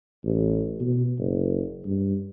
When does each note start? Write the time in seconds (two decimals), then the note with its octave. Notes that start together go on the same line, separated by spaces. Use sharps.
0.25 A1
0.80 B2
1.18 F#1
1.85 G2